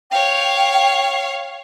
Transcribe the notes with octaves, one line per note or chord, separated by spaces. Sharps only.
C#5 F5 G5